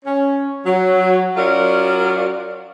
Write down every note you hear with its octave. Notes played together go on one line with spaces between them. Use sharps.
C#4
F#3
F#3 C#4 F4 A#4 D5